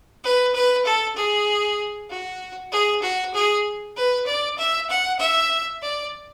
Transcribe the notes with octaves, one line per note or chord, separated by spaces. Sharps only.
B4
B4
A4
G#4
F#4
G#4
F#4
G#4
B4
D5
E5
F#5
E5
D5